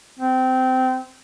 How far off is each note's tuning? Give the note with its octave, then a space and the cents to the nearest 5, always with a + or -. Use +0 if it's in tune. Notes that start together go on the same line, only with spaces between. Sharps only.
C4 -20